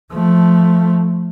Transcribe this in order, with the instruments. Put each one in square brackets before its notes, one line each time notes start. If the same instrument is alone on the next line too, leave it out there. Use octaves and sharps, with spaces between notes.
[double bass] F3 A3